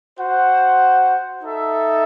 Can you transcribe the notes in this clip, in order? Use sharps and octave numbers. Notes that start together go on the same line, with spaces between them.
F#4 C5 F#5
D#4 A4 E5